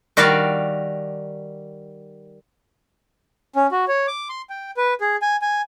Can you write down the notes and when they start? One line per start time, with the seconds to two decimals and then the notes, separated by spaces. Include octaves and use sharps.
0.17 D#3 G3 F#4 D5 F5
3.56 C#4
3.72 F#4
3.88 C#5
4.07 D6
4.29 C6
4.50 G5
4.77 B4
5.01 G#4
5.22 G#5
5.42 G#5